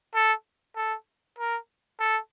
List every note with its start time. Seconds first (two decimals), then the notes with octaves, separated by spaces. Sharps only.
0.14 A4
0.76 A4
1.39 A#4
2.00 A4